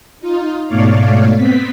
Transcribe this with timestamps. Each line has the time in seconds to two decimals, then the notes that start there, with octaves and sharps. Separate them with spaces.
0.20 D#4 F4
0.66 G#2 B2 A3 C#5 D5 F5
1.36 B3 C4 B6